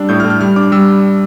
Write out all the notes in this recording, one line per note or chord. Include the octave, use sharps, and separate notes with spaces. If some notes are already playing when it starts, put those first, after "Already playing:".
Already playing: G3 D4 E6
A2 G6
F6
A2
F6
G3 F6
D4 D6
G3 E6